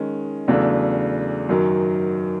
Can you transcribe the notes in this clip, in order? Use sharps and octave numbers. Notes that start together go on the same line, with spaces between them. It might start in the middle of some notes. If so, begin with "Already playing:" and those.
Already playing: D#3 G#3 C#4
E2 C#3 F#3 A3 D4
F#2 D#3 F#3